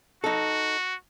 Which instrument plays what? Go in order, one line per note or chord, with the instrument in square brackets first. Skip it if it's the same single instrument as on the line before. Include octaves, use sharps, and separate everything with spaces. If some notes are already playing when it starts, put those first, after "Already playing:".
[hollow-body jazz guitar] D#4 A4 [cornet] F#4